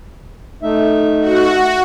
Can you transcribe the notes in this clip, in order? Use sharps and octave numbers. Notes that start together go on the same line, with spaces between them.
A3 D#4 E5
F#4